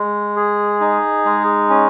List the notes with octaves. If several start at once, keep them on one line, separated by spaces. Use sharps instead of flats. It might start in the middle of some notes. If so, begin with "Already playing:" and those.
Already playing: G#3
G#4
D#4
G#3
C#4